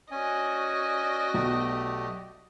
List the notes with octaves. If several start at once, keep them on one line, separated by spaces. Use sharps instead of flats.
C#4 F#4 D5 D#5 G#5
B1 A3 G4